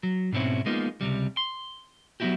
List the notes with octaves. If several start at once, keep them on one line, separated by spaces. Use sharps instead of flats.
F#3
G#2 B2 C4 C#4 E4
G#3 A#3 B3 D#4 F4
C#2 C3 G3
C6
F#3 B3 C#4 E4 F#4 G4